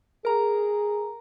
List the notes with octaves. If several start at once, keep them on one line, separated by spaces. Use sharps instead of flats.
G#4 A#4 A#5